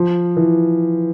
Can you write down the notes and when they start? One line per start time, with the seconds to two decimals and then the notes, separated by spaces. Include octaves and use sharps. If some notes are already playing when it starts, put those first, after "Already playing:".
Already playing: F3
0.37 E3